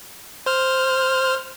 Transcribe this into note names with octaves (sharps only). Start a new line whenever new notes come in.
C5 F6